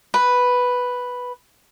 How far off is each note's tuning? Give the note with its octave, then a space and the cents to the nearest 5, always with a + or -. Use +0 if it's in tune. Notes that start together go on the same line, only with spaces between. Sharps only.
B4 +0